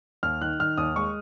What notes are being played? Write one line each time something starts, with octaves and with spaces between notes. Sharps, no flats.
D#2 F6
D#3 F#6
D#3 F6
D#2 D#6
G#3 C#6